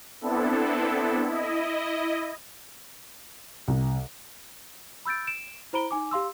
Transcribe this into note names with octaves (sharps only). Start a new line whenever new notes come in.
B3 C4 D4 E4 A4
E4 D#5
C2
B5 E6 G6 A6 D7
D7 E7
E4 C5 A#5 B5 D7 G7
D#4 G#5 D6
G4 F5 C6 E6